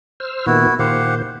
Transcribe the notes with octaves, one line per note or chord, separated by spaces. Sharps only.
C5 E6 F6
A#2 D#3 B3 E4 F#4
A#2 D#3 G4 C5 F5 F#5